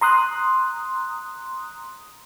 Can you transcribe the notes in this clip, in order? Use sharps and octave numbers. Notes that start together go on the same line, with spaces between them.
A#5 C6 D#6 F#6